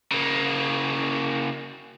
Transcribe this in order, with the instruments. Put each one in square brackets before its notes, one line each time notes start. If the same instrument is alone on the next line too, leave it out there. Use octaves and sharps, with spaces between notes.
[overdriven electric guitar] C#3 A#3